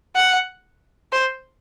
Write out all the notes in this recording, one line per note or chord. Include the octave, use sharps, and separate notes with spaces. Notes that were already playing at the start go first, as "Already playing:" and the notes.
F#5
C5